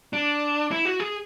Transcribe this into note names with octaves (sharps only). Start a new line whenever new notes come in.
D4
E4
F#4
G#4